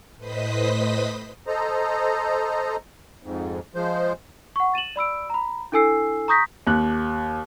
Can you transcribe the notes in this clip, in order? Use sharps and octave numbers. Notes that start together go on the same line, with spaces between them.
A2 B4 C5 D#5 D#6 B6
A4 C5 D#5 A#5
F2 G#2
F3 G#3 C5
F#5 C#6
A6 D#7 E7 F#7
D5 B5 E6 D7
A#5 B5
D4 E4 A4 G#5 E6 C7
A#5 C#6 D#6 G6 A#6 B6
D#2 F#6